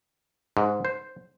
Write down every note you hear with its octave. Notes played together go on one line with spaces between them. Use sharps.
G#2
C5